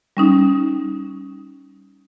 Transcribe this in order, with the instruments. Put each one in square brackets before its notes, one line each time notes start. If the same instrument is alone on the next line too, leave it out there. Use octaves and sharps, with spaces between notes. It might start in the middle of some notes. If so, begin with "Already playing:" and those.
[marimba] G3 C#4 D#4